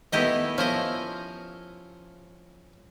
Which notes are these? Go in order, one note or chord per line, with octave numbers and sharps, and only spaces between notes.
D#3 A3 B3 E4 G4 D#5
F3 C#4 E4 A#4 D#5 F5